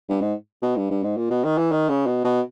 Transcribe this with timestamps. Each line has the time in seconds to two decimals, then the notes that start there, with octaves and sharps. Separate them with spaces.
0.09 G2
0.22 G#2
0.62 B2
0.76 G2
0.90 G2
1.03 G#2
1.17 A#2
1.30 B2
1.44 D#3
1.58 E3
1.72 D#3
1.89 C#3
2.07 B2
2.25 B2